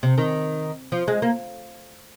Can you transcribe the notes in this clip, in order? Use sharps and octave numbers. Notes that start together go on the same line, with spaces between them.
C3
D#3
F3
G#3
A#3